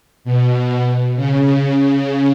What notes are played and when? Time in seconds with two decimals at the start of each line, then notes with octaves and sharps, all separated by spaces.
0.24 B2
1.16 C#3